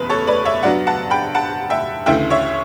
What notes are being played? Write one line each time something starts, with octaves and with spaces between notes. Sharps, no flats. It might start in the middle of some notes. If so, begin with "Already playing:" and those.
Already playing: F#1 E2 B2 B4
A4 C#5
B4 D5
C#5 E5
G2 F#3 B3 D5 F#5
F#5 A5
G5 B5
F#5 A5
E5 G5
D2 C#3 E3 A3 E5 G5
C#5 E5